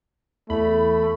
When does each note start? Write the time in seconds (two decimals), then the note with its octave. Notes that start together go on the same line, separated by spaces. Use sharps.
0.50 E2 A3 B5